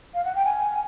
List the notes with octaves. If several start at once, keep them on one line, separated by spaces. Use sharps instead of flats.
F5
F#5
G5
G#5